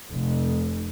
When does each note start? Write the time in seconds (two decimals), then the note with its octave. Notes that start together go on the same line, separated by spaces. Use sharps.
0.11 F1